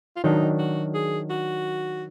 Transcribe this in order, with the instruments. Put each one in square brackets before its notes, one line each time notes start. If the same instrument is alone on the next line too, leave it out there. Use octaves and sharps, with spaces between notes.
[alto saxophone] F4
[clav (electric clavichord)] D#3 F#3 D4 [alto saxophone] D#4
[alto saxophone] F#4
G#4
F#4